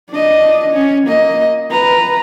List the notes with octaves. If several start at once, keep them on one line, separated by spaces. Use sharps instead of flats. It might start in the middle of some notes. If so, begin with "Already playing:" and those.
D4 D#5
C#4
A#3 D#5
B4 A#5